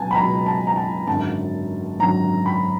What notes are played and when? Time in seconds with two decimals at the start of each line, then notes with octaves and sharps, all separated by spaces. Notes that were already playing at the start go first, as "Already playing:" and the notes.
Already playing: C#2 B2 F#3 G#5 A5
0.11 B5
0.15 C#2 B2 F#3 A#5
0.46 A5
0.67 A#5
0.76 A5
1.07 G#1 F#2 D3 F#3 A5
1.99 G#1 F#2 D3 F#3 A#5
2.46 B5